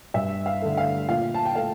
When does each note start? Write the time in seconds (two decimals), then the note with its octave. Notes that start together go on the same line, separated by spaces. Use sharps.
0.14 G2 E5
0.46 F5
0.62 D3 A3
0.77 F5
1.08 A#2 F5
1.34 A5
1.45 G5
1.55 A3 F5